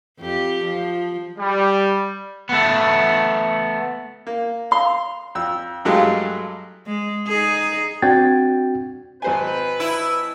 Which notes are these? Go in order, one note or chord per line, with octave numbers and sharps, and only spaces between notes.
F2 G4
F3
G3
A3 B3
A#3
F5 C6
F2 E6
G2 F#3 G#3 A3 G4 F5
G#3
D#4 G#4
C4 D4 F#4 G5 G#6 A6
G#1 B4 C5 G#5
E4